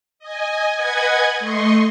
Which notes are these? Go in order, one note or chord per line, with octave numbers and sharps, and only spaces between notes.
D#5 G#5
B4 D#5 F#5 G#5 G#6
A3 D#5 C6 C#6